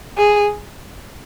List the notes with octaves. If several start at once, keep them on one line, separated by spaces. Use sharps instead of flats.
G#4